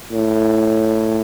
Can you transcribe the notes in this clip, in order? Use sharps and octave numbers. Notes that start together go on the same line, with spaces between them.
A2